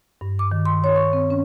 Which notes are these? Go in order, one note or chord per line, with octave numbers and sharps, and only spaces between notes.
G2
D6
D#3
C6
C#5
C#6
C4
C#4